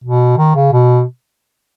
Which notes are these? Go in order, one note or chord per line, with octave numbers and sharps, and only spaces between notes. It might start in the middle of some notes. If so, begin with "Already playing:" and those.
B2
D#3
C#3
B2